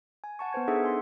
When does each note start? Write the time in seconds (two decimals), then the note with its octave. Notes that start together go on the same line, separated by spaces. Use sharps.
0.24 G#5
0.39 F#5 A5 C#6
0.53 B3 B4 C5 G#6
0.68 D4 D#4 G#4 A4 E5 F#5
0.83 G#5 C6